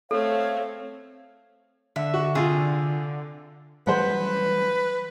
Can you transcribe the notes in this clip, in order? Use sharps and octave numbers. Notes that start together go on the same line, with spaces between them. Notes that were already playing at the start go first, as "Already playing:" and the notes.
A3 C4 A4 C#5 F5
D3 E5
F#4
C3 F4 G#4
E3 F#3 G3 B4 C5 F#5